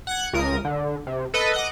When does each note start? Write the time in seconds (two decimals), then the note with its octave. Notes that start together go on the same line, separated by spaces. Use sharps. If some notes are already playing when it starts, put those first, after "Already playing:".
0.07 F#5 F#6 G#6
0.33 C#2 A#4 D#6
0.65 D3
1.07 C3
1.34 A4 B4 D#5
1.54 D#5 F#5 D6